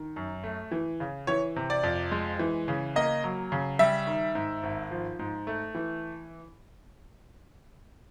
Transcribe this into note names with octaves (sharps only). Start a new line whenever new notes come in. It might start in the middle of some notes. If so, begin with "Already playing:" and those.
Already playing: D#3
F#2
A3
E3
C#3
E3 C#5
C3
D5
F2
G#3
E3
C#3
A#3 D#5
F#3
C#3
G3 E5
D#3
G#2
G#1
F3
G#2
A3
E3